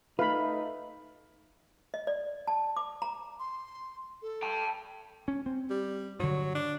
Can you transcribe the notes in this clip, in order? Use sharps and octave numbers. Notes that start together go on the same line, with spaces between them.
A3 D#4 B4 F5 B5
D#5
D5
A5
D6
A#5
C6
A4
G5 A5
C#4
C4
G3
G2 D3 F#3
D4